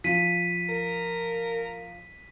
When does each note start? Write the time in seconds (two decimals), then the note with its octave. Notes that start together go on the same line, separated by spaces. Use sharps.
0.04 F3 B6 D#7
0.69 A#4